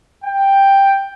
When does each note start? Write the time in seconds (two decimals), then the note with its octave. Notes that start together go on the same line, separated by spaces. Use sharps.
0.25 G5